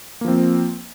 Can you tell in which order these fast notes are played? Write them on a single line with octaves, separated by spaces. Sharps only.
A#3 F3 C4